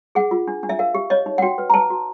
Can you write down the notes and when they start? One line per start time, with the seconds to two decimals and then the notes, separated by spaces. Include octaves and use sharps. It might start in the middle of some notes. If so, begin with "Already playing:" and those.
0.15 G#4 F#5
0.31 F4
0.48 D4
0.63 D4
0.69 E5
0.79 A#4 F5
0.94 G4
1.10 C#5 D#5
1.26 D#4
1.38 F#5
1.42 F#4 G5
1.58 B4
1.70 A#5
1.74 B4 A5
1.90 F#4